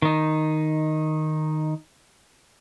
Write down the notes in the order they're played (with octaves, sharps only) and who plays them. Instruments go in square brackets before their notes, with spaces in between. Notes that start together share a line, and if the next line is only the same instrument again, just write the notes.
[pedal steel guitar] D#3 D#4